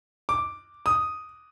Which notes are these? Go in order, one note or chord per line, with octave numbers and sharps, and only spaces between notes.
D6
D#6